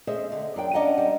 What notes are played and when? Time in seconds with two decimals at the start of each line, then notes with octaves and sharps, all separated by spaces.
0.07 A3 C#4 G#4 C5 D#5 E5
0.32 D3
0.56 F#2 D4 G5
0.73 C#4 D4 D#5 F5 F#5 A#5
0.98 G3